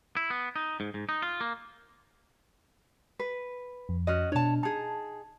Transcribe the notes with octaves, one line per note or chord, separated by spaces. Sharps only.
E4
B3
D#4
G#2
G#2
D#4
F4
A#3
B4
F2
C#4 F#4 D#5
B2 D4 C#5 A5
D#4 G#4 A5